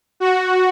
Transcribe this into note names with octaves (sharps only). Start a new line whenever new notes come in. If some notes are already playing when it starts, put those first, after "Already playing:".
F#4